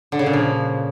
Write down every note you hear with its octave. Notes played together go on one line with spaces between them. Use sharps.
D3
C#3
A#2
F3